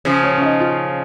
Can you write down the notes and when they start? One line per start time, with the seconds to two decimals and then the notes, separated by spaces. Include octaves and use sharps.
0.05 C#3 F3
0.23 C#4
0.38 C#4
0.42 D#4
0.60 F4